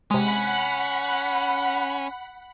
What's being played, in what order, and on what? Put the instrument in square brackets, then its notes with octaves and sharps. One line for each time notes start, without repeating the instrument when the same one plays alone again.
[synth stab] C3 G#3 [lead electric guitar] C#4 [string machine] F#5 B5